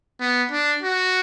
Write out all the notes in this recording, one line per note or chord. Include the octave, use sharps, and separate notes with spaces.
B3
D4
F#4